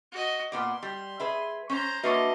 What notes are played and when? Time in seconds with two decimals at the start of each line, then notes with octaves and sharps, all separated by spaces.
0.12 F#4 D#5
0.52 A#2 B3 D5 C6
0.83 G3
1.20 G#4 B4 E5
1.70 C#4 C5 A#5
2.03 A#3 D4 F#4 B4 C#5 D#5 E5